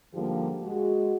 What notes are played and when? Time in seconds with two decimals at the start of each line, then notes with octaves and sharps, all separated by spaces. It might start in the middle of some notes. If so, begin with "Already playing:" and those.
0.13 G#2 D3 F3 G3 A#3 G4
0.63 G#3 F#4